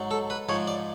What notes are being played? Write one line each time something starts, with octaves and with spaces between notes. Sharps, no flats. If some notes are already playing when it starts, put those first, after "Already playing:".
Already playing: G#2 F#3
A4
B4
G#2 F3 C#5
D5